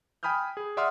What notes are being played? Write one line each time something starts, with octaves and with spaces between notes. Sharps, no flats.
G5 G#5 B5 D#6 F6 G6
G#4
D5 E5 F#5 C6 D#6 F6